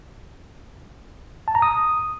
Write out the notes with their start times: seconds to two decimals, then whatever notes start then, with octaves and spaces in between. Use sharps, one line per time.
1.48 A5
1.55 A#5
1.62 D#6